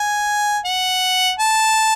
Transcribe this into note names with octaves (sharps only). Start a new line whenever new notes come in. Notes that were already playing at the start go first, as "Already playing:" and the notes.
Already playing: G#5
F#5
A5